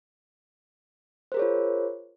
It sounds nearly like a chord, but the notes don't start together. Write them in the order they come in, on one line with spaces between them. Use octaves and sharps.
C5 A#4 G#4 C#5 F4